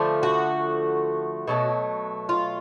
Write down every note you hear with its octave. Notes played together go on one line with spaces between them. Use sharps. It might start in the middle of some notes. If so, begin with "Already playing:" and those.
Already playing: D3 F3 A3
F#4
B2 F#3 A3
F4